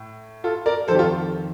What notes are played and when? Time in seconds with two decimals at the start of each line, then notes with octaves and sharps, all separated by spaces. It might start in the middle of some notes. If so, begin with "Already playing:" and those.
Already playing: A2
0.44 F4 A4
0.66 A#4 D5
0.88 F2 A4 C5
0.91 D#3 G4
0.99 F4 A4